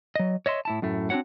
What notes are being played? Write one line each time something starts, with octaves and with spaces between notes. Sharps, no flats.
F#3 D#5
C#5 D#5 E5 C6
A2 E4 A5
F#2 A2 A3
C4 D4 E4 F#4 C#5 F#5